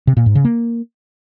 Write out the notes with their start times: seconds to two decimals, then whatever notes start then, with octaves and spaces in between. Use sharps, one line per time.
0.07 C3
0.17 A#2
0.26 G#2
0.35 C#3
0.45 A#3